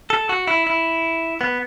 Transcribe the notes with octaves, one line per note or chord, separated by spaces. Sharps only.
A4
F#4
E4
E4
B3